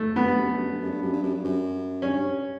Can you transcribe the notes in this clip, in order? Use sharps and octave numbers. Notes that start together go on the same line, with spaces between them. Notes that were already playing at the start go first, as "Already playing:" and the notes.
Already playing: A3
F#2 B3
G2
F#2
G2
F#2
G2
F#2
G2
F#2
G2
F#2
G2
F#2
G2 C#4